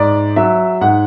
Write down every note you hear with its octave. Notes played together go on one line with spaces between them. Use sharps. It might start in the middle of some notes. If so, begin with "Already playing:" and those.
Already playing: G#2 D5
F#3 E5
G#2 F#5